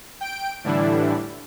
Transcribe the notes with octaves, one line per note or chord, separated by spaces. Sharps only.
G5 D7
A2 D3 E3 G3 D4 E4